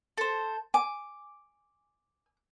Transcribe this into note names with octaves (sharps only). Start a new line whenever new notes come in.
A4 C5
G#5 D6